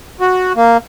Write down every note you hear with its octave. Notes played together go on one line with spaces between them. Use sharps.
F#4
A#3